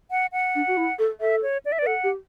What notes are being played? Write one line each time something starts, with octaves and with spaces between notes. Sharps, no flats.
F#5
F#5
D4
F#4
E4
A4
A4 E5
C#5
D5
E5
D5
B4
A4 F#5
G4